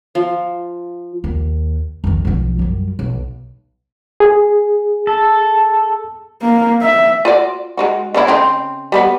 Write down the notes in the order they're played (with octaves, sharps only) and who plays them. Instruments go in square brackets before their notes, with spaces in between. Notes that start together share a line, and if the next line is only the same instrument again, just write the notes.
[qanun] F3
[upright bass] D#2
F1 D#3
B1 F3
F#2 G3
B1
[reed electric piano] G#4
[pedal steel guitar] A4
[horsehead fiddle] A#3
E5
[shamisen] F4 F#4 D5
G#3 D#4 F#4
D3 B3 E4
C#3 C4 D#4
G3 G#3 B3